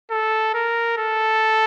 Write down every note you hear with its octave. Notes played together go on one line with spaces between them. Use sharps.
A4
A#4
A4